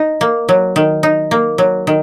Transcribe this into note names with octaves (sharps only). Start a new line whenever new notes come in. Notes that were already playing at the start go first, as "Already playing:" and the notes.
Already playing: D#4
A#3
F#3
D#3
D#4
A#3
F#3
D#3